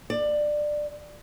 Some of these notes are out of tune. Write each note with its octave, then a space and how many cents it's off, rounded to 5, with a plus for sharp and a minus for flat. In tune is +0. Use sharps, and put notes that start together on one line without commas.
D5 +15